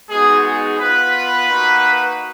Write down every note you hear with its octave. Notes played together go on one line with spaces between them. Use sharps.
G#3 B3 D#4 F#4 G#4
G#4
B3 F4 B4
A#3 D#4 F#4